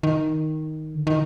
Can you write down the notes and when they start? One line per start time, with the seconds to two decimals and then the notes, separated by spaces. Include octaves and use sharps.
0.03 D#3
0.95 D3
1.07 D#3